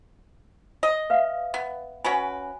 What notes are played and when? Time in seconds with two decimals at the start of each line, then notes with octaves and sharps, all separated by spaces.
0.83 D#5
1.10 B4 E5 F5
1.54 B3
2.04 C#4 F#4 B4 G#5